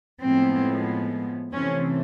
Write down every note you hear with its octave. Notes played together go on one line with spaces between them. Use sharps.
A2 F3 G#3 B3 C4
C3 E3 A3 C4 C#4